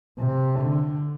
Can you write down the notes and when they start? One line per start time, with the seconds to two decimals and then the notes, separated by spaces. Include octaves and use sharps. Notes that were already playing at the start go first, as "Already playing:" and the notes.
0.18 C3
0.60 D3